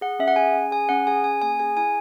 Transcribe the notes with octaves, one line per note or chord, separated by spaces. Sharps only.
G#4 F#5
C#4 E5
F#5
G#4 G#5
C#4
G#4 G#5
C#4 F#5
G#4 G#5
C#4 G#5
A#3 G#5
G#4 G#5
E4 G#5